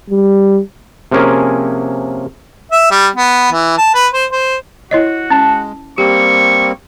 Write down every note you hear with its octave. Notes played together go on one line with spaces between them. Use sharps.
G3
C3 F3 A#3 C#4 G#4 A#4
E5
G3
B3
E3
A5
B4
C5
C5
E4 F#4 C#5 D#5
G#3 C#4 A5
G3 A#3 C4 G4 C#6